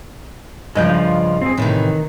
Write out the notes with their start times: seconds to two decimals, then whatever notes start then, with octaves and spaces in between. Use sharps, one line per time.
0.75 G2 C#3 F3 G#3 D#5 G6
0.89 F4 D#5 F5
1.42 C4 G#4
1.57 A2 C3 D#3 E3